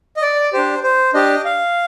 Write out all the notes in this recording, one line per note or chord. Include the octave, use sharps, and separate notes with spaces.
D#5
D5
D4 G4 C5
C5
D4 G4 D#5
F5